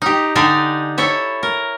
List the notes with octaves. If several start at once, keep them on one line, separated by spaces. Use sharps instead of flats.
D#4 G4
D3 D4 D#4 G4 G#5
E4 A4 C#5 E5
A#4